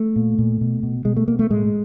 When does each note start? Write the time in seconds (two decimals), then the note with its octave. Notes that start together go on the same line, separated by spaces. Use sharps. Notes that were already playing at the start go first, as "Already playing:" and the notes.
Already playing: A3
0.16 A#2
0.38 A#2
0.61 B2
0.83 B2
1.05 B2 G#3
1.17 A3
1.28 B2 A#3
1.39 A3
1.50 A2 G#3